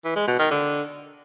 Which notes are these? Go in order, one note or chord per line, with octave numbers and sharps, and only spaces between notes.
E3
G#3
B2
D#3
D3